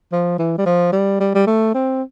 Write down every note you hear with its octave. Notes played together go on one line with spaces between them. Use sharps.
F3
E3
G3
F3
G3
G3
G3
A3
C4